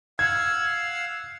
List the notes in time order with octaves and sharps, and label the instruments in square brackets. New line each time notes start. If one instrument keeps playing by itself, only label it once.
[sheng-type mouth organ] F5 F#5 E6 [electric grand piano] G#6